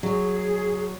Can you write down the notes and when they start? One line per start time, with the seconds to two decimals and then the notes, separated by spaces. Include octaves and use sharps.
0.03 F#3 G#4